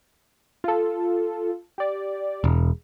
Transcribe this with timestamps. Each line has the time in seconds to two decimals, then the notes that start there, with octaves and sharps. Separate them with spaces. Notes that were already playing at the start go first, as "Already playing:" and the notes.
0.64 F4 A4
1.78 G4 D5
2.44 E1